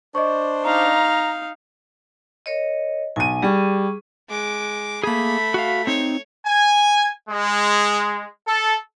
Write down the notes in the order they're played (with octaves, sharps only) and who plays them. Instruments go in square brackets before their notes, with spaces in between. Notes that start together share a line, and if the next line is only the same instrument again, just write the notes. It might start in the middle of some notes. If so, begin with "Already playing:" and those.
[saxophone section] D4 C5 [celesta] D#5 C#6
[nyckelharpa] D#4 F5 [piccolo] A#5
[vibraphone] A#4 C#5 D#5
[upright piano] B1 D#7 [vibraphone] G#5
[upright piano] G3 [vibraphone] G#4 C#6
[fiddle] G#3 D6
[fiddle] A3 B5 [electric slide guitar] A#3 G#4
[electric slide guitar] F#4 F5
[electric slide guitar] C4 D#4 [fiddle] C#5
[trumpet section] G#5
G#3
A4